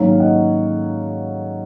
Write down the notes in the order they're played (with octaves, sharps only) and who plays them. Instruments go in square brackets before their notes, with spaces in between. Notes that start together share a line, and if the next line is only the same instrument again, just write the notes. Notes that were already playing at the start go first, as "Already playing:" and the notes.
Already playing: [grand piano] G#2 D#3 F#3 A#3 C#4 C#5 F5
F5
D#5 F#5